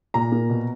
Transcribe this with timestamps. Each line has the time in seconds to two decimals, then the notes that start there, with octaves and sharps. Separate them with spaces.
0.14 A#2 A#5
0.32 A#3
0.49 B2